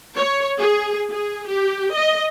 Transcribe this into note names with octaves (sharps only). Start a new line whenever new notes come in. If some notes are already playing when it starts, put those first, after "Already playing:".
C#5
G#4
G#4
G4
D#5